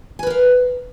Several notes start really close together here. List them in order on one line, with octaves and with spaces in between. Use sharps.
G#5 B4 A#4 F5